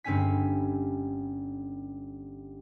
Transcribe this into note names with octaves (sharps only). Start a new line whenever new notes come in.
G1 G2 C4 C#4 G#5 B6